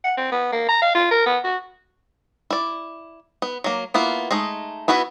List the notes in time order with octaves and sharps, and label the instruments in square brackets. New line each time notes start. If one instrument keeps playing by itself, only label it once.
[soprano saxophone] F#5
C4
B3
A#3
A#5
F5
F4
A#4
B3
F#4
[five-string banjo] E4 D5
B3
F#3 A#3
A#3 B3 E4 F4
G#3 A3 D#4
B3 E4 F#4 B4 E5